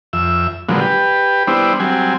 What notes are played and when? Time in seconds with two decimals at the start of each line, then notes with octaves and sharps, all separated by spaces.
0.13 F2 E5
0.69 A#2 D3 F3 F#3 G#3 B3
0.81 G4 B4
1.47 G3 B3 D4 E4 C5
1.80 F#3 G3 C4 G#5